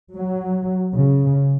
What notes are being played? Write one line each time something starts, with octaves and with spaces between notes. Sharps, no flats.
F#3
C#3